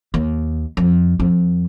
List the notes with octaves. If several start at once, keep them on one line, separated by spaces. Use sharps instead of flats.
D#2
F2
F2